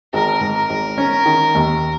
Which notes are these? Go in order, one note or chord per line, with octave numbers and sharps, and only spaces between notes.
G#1 A#4
G#2
A#4
G#1
C#4
D#3
D#2